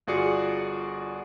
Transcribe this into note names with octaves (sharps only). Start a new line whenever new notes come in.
G1 F4 F#4 G#4 D5 C#7